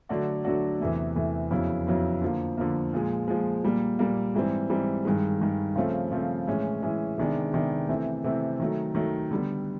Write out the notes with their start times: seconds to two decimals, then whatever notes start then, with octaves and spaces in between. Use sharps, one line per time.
0.09 D3 F#3 A3 D4 F#4
0.44 D3 F#3 A3 D4 F#4
0.80 E2 C3 E3 A3
1.16 E2 C3 E3 A3
1.51 F2 C#3 F#3 B3 E4
1.87 F2 C#3 F#3 B3 E4
2.22 D3 F3 A#3
2.57 D3 F3 A#3
2.93 A#2 F3 G#3
3.28 A#2 F3 G#3
3.64 A#2 G3 A#3
3.99 A#2 G3 A#3
4.35 G#2 E3 G3 C4
4.69 G#2 E3 G3 C4
5.05 G2 D#3 G#3
5.41 G2 D#3 G#3
5.76 C#3 F3 A3 C4
6.12 C#3 F3 A3 C4
6.48 A2 E3 G#3 C#4
6.82 A2 E3 G#3 C#4
7.18 C3 D#3 G#3 B3 D4
7.54 C3 D#3 G#3 B3 D4
7.89 C3 E3 A3 C4
8.24 C3 E3 A3 C4
8.60 D#3 F#3 A3
8.95 D#3 F#3 A3
9.31 D3 G3 B3